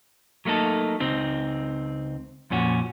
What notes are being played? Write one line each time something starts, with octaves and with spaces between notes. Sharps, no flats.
F#3 A3 A#3 D#4 A4
C#2 C4 D#4
F2 A#2 C#4 F#4